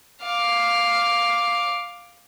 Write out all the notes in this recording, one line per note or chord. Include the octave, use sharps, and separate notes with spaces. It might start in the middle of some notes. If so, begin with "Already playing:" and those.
F5 D6